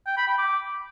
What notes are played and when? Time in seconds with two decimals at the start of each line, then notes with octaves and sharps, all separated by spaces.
0.07 G5
0.17 B5
0.28 G5
0.38 D6